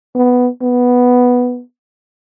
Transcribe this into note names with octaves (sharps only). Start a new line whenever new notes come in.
B3
B3